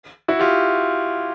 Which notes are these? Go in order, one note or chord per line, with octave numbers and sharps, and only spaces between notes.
E4 F#4
F4 G4